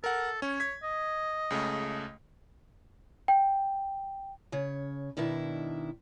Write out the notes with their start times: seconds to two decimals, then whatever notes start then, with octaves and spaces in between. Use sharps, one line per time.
0.04 A4 A#4 F#5
0.42 C#4 C#5
0.60 G#6 B6
0.83 D#5
1.50 C#2 C#3 A3
3.28 G5
4.52 C#3 C#5
5.17 B2 D#3 D4 E4